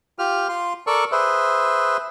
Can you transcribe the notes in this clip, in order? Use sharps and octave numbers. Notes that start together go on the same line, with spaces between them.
F4 G4 F6
F4 C6
A4 A#4 D5 C#6 E6
G#4 B4 C5 E5